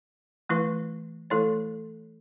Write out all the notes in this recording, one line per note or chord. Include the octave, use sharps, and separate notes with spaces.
E3 A3 E4 B4
E3 A3 E4 A4 C#5